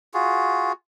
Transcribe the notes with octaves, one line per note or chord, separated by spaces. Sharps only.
F4 F#4 G#4